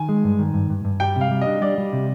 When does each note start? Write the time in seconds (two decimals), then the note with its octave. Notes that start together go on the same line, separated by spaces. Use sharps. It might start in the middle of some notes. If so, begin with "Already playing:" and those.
Already playing: D#3 G#5
0.09 G#3
0.24 G2
0.39 D#3
0.54 G2
0.70 G2
0.85 G2
1.00 G3 G5
1.16 C3 F5
1.31 G3
1.41 D#5
1.47 D4
1.62 G3 D5
1.78 G3
1.93 C3